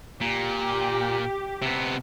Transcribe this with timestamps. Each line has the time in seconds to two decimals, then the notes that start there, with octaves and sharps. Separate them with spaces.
0.21 A#2 G4
1.62 C3 B3